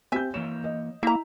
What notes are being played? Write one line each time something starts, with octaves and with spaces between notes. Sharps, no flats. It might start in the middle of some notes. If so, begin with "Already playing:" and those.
C4 G4 E5 G#5 G6
E3 A#3 C#5 E7
D#5
A#3 E4 E5 A#5